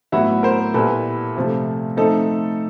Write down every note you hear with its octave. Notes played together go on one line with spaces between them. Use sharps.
A2 F#3 B3 E4 E5 F#5
A#4 C5
A#2 G3 B3 E4 A4 B4
C3 F3 A3
F3 A3 C4 D#4 A4